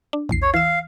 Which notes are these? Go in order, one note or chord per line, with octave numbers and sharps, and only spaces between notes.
D4
A#1 E2 C7
C#5
E3 F5 E6